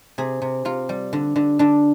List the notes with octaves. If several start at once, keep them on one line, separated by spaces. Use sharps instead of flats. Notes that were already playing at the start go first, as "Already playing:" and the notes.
C3 G#4
C3
C3 F4
G3
D3
D3
D3 D4